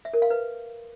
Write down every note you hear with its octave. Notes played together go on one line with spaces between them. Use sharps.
E5
A#4
F5
B4